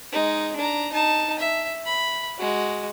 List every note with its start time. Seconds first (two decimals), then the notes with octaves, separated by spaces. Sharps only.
0.13 G#3 D#4
0.56 D4 A#5
0.92 D#4 A5
1.39 E5
1.86 B5
2.38 G#3 F#4